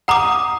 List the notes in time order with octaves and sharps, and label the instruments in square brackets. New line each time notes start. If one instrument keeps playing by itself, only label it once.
[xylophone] F#5 A#5 D6 [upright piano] D#6